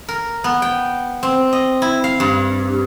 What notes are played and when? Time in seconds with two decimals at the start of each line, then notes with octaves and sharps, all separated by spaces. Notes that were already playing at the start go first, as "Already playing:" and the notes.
0.08 A#4
0.44 B3
0.62 G5
1.23 C4
1.53 D#5
1.82 E4
2.04 F5
2.20 G2